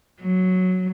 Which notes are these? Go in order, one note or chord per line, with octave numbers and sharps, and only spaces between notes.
F#3